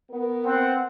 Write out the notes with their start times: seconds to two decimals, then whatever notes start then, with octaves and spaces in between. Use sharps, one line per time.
0.11 B3 A#4
0.46 C4 F#5